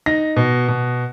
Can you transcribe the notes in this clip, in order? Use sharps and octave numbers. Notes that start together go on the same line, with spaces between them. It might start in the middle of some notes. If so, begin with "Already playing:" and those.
D#4 A#6
B2
B2